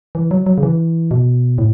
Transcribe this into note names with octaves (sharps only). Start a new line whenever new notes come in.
E3
F#3
F#3
C#3
E3
B2
A2